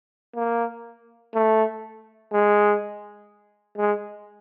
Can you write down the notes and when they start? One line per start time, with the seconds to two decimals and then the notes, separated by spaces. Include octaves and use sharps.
0.36 A#3
1.34 A3
2.32 G#3
3.78 G#3